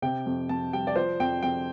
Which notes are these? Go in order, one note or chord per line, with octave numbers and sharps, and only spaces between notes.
C3 G5
F2
F2 A5
G3 G5
D5
F3 C5
F2 G5
F2 G5